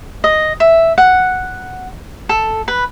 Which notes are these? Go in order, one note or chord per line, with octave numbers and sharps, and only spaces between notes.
D#5
E5
F#5
A4
B4